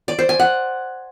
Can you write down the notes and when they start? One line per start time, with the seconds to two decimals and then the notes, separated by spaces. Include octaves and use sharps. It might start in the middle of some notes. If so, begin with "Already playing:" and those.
0.08 D5
0.19 C5
0.29 G#5
0.39 F#5